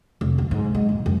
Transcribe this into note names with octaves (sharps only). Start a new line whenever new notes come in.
F1
D2
G#2
G#3
D#1
F#2